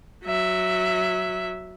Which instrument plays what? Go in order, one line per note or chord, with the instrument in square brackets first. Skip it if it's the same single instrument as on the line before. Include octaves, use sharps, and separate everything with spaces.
[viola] F#3 E5